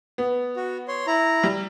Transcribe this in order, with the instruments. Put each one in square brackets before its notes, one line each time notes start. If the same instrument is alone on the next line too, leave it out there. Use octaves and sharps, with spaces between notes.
[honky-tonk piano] B3
[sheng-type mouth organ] F#4
C#5 C6
E4 A#5
[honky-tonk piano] G3